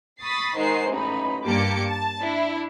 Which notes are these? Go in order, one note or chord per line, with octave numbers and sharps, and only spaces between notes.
B5 C#6 D#6 A6 B6 C7
D#3 G#3 D#4 C5 F#5 C7
A1 D#4 B5
G2 A#3 G4 A5 D6 C#7
A5
D4 E4